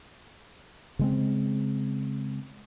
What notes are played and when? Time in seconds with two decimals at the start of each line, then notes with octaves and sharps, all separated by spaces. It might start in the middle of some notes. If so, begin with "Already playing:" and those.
0.99 C#3 G#3 C4